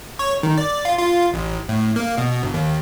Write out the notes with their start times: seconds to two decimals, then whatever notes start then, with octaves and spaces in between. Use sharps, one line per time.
0.19 C#5
0.43 D#3
0.57 D5
0.85 F4
0.98 F4
1.34 A1
1.69 A2
1.96 A#3
2.18 B2
2.43 G1
2.54 D#2